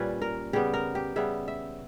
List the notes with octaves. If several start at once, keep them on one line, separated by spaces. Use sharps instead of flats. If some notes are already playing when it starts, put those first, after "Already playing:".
Already playing: A#2 G3 C#4 B4
A#4
C#3 G3 B3 G4
A#4
G4
C#3 G3 B3 E5
E5